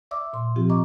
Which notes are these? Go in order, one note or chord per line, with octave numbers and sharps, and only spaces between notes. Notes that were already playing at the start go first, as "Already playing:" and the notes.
D5 E5 D6 E6
A#2 C6
G#2 F3 C4 F4 G4
D#5 A#5 C#6 D6